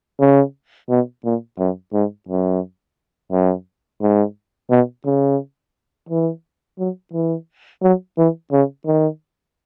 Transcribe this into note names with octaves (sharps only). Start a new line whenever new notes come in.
C#3
B2
A#2
F#2
G#2
F#2
F#2
G#2
B2
C#3
E3
F#3
E3
F#3
E3
C#3
D#3